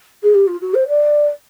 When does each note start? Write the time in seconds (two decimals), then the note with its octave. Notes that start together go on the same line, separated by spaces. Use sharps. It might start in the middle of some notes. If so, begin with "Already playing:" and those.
0.23 G#4
0.34 G4
0.47 F4
0.61 F#4
0.74 C5
0.88 D5